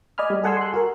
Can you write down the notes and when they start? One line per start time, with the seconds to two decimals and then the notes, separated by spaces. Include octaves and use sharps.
0.18 D5 D#5 G#5 B5 F6
0.30 G3
0.43 G#4 A4 F#5 G#5 C6 E6
0.57 C6 F#6
0.74 F#4 A#4